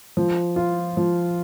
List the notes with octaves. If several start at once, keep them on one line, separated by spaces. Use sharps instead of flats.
F3
F4
F3